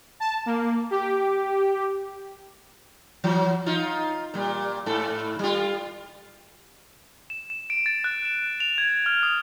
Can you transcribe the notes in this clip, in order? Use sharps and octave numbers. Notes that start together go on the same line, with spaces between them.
A5
A#3
G4
E3 F#3
D#4 F4
A#2 G3
G#2 A4
G3 F4
E7
E7
D7
A6
F#6
E7
F7
G#6
F6
D#6